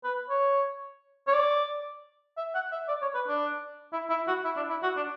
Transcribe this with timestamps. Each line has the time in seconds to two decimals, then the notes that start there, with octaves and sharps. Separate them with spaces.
0.04 B4
0.30 C#5
1.27 C#5
1.33 D5
2.37 E5
2.55 F#5
2.72 E5
2.88 D5
3.02 C#5
3.14 B4
3.28 D4
3.93 E4
4.10 E4
4.27 F#4
4.44 E4
4.57 D4
4.69 E4
4.83 F#4
4.97 D4